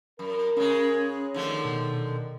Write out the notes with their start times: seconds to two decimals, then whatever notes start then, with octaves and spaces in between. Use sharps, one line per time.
0.19 F#2 A#4
0.57 C#3 G#3 C#4
1.34 D3 D#3 F3 A3
1.65 B2